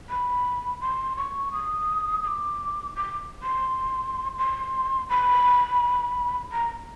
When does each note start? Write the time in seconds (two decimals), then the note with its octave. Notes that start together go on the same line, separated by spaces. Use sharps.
0.09 B5
0.81 C6
1.17 C#6
1.52 D#6
2.23 D#6
2.27 D6
2.95 D6
3.43 C6
4.38 C6
5.09 B5
6.52 A#5